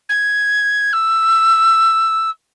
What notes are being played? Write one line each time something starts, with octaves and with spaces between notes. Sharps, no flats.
G#6
E6